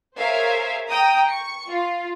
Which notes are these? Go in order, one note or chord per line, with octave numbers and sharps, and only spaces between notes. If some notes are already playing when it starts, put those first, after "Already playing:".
G#4 A#4 C5 C#5 E5 F5
G5 A#5 D#6
C#6 C#7
F4